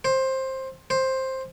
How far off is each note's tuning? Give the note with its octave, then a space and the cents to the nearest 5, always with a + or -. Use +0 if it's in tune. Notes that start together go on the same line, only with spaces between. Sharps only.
C5 +15
C5 +10